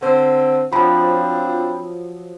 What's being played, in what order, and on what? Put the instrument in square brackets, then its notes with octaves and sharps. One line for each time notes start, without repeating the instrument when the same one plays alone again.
[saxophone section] D3 C4 [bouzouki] C5
[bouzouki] F3 F#3 [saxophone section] C4 D4 F4 [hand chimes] B5